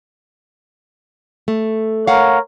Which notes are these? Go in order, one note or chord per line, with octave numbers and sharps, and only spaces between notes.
A3
A#4 C#5 F5 F#5